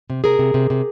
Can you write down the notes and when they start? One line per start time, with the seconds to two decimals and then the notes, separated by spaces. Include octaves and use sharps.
0.10 C3
0.24 C3 G#4 A#4
0.39 C3
0.54 C3
0.70 C3